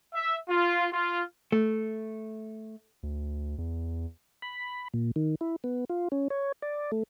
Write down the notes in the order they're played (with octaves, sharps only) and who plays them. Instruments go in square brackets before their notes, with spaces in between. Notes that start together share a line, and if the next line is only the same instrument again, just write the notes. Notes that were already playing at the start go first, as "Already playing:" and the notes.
[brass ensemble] E5
F4
F4
[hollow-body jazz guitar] A3
[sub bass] D2
E2
[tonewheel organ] B5
A#2
D#3
E4
B3
F4
C#4
C#5
D5
A3